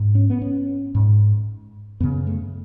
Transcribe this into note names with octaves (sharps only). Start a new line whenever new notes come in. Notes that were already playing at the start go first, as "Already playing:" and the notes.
Already playing: G#2
C#4
B3
C#4
G#2
F#2 C#3 B3
A3